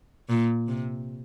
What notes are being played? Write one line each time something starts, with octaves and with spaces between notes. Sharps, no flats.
A#2
C3